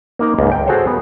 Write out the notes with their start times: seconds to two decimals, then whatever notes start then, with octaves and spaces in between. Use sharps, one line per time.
0.19 A#3 D#4 A#4
0.39 C#2 G#2
0.52 G5
0.67 F#4 G#4 A4 C5 C#5
0.87 B3 A#4